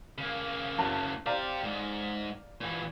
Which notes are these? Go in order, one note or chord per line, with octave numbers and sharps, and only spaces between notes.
C#3 A#3
F#1 F#3 A5
G4 C5 D5 F5 A#5
G#2
A#2 E3